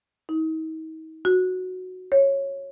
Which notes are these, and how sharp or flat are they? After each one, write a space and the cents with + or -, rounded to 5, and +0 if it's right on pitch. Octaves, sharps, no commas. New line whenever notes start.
D#4 +40
F#4 -5
C#5 -10